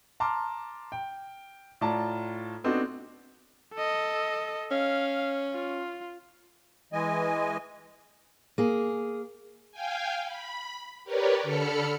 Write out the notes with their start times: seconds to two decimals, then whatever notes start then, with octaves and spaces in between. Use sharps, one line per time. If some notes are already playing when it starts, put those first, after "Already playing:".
0.20 A5 A#5 C6 D6 F6
0.92 G5
1.81 A2 F4 D5 A5 A#5
2.64 B3 C4 D4 D#4 F#4 A4
3.74 A4 D#5
4.71 C#4 F5
5.54 F4
6.93 E3 G#3 D#5 G#5
8.58 A#3 G#4
9.72 F5 G5 G#5
10.25 B5
11.04 G4 A#4 B4 C#5 D5
11.43 D3 A4 B5 F6 C#7